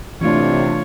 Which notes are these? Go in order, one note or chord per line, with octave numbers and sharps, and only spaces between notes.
C3 E3 A3 D4 F4 C#5